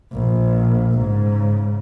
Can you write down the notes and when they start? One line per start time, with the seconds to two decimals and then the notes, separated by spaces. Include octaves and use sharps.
0.13 A#1
0.98 G#2 C#3